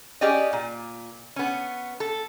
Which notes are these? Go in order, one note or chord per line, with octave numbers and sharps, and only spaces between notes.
C#4 G4 G#4 D5 D#5
A#2
B3 C#4
A4